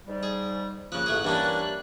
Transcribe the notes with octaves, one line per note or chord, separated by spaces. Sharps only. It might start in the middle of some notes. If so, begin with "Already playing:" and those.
G#2 G3
G#4
C#3 F3 A#3 F#6
A1 A3 G#4
E3 G3 A#3 C#4 D4